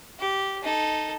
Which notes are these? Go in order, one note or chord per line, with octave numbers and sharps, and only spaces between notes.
G4
D#4 A4